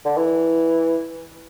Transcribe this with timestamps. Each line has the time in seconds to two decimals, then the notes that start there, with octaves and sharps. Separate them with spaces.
0.06 D3
0.17 E3